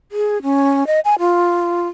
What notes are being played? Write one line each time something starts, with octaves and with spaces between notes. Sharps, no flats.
G#4
C#4
D#5
G#5
F4